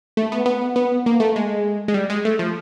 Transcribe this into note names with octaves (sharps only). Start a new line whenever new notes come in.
A3
B3
B3
B3
A#3
A3
G#3
G#3
G3
G#3
A3
F3